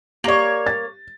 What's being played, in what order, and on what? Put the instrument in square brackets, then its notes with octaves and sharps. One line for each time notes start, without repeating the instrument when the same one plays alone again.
[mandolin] A#3 C#5 [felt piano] G4 D5
[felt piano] A6